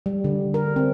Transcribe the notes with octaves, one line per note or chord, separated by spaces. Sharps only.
G3
D3
A#4
C4